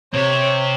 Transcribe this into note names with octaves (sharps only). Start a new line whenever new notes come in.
C3 C#5